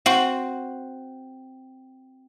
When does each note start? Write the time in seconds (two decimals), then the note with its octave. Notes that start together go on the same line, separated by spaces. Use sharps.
0.06 C4 F#4